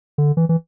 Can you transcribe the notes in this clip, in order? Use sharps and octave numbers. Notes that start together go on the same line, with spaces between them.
D3
E3
E3